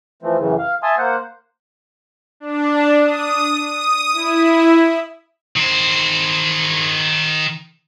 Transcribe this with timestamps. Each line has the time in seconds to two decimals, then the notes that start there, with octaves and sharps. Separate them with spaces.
0.23 E3 F3 A3 C4
0.38 F#2 A2 C#3 E3
0.58 F5
0.83 E5 G#5 A5 C6 D#6
0.98 A#3 C5 F#5
2.40 D4
3.04 D#6
3.67 D#6
4.13 E4
5.56 D#3 C5